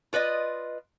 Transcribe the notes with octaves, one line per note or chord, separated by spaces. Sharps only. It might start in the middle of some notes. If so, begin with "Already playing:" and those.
F4 B4 D5 D#5